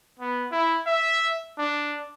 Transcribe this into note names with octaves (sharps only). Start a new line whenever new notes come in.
B3
E4
E5
D4